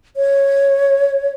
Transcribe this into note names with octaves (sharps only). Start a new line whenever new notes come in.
C#5